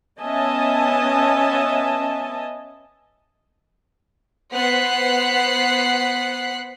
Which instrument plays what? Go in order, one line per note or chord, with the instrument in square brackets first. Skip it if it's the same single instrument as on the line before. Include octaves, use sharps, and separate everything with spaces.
[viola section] B3 C#4 D#5 E5 G#5 A5
[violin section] B3 C5 F#5 F#6 B6 C7